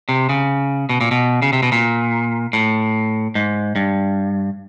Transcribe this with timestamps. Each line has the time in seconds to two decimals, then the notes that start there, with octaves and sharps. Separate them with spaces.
0.09 C3
0.29 C#3
0.89 B2
1.01 A#2
1.11 B2
1.42 C#3
1.53 C3
1.63 B2
1.72 A#2
2.53 A2
3.35 G#2
3.76 G2